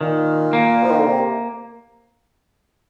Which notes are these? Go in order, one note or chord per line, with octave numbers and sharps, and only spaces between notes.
A#2 D#3
A#3
F3
D#3
D3
C3